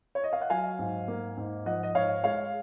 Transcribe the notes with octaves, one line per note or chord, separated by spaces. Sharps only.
C#5
D#5
F5
F#5
F#3 F5 G#5
G#2
A#3
G#2
F3 D#5 F#5
D#5
G#2 C#5 F5
G#3 C#5 F5